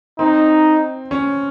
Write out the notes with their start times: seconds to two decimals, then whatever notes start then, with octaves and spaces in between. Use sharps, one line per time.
0.19 C4 D#4
1.11 C#4